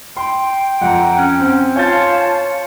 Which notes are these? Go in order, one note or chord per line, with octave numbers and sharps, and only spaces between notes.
G5 C6
F2 F#5 A#5
C#4
C4
F4 C#5 F5 G#5 A5 G6 A6